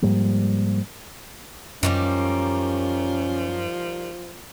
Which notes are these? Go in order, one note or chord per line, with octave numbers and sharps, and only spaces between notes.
G#2 F3 G3 A#3
F#2 D#3 F3 G3 A#3 C#4